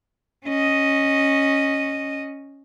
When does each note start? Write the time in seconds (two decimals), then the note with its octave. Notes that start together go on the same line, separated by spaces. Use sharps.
0.45 C#4 D#5